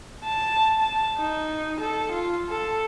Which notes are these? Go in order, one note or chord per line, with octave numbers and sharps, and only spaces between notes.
A5
A5
D#4
A4
F4
A4